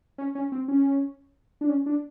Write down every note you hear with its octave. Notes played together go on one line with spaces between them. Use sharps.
C#4
C#4
C4
C#4
D4
C#4
D4